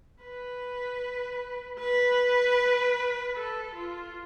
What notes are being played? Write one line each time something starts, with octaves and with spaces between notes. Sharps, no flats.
B4
B4
A4
F4